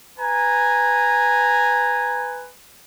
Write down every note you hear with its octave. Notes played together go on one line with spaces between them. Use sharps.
B4 G#5 A#5